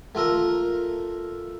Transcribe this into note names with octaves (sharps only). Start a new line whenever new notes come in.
A3 F4 A4 A#4